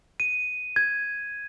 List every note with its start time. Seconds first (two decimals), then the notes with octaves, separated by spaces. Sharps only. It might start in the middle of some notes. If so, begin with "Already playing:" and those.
0.20 D#7
0.76 G#6